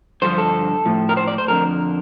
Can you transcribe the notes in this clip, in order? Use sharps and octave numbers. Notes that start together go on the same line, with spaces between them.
G2 D3 F3 C5
A4
A2 F3
A#4
C5
D5
C5
F2 D3 F3 A#4